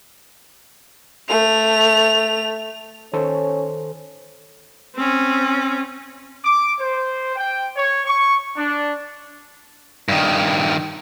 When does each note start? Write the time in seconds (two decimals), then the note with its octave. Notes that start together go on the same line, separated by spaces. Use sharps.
1.29 A3 F7
3.13 D#3 C#4 A4 C5
4.96 C4 C#4
6.45 D6
6.80 C5
7.36 G5
7.76 C#5
8.06 C#6
8.58 D4
10.09 G2 D#3